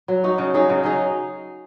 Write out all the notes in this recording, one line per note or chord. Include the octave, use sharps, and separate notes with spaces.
F#3
D#4 F#4
C#3
F#3 D#4 G#4
C#3
F#3 D#4 G#4